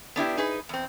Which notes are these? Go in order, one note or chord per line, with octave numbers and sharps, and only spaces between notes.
B3 D4 E4 G4
D#4 G#4 B4
E2 C4